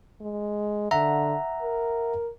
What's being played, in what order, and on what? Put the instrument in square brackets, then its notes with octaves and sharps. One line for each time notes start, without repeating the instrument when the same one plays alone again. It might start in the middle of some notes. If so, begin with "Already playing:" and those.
[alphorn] G#3
[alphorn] D3 [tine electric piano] E5 F#5 A#5
[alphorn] A#4